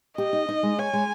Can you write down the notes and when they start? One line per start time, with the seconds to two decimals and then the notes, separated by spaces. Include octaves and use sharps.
0.18 G4 D#5
0.33 D#4
0.49 D#4
0.63 G#3
0.78 C#5 G#5
0.93 G#3